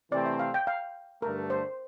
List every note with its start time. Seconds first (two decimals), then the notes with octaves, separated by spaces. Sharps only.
0.12 C3 E3 A3 C4 D5
0.26 E5
0.39 F5
0.54 G5
0.67 F5
1.22 G2 D3 A3 A#4
1.50 C5